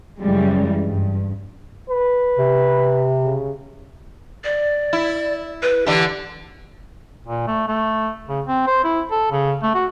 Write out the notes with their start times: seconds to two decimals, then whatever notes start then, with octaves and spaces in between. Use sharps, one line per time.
0.19 F#2 C#3 E3 G3 G#3
0.82 G2
1.90 B4
2.37 C3
3.24 C#3
4.44 D5
4.93 E4
5.63 B4
5.86 D3 E3 G4
7.27 A#2
7.47 A3
7.68 A3
8.29 C#3
8.47 C4
8.67 C5
8.84 E4
9.11 A4
9.32 C#3
9.63 A3
9.75 F#4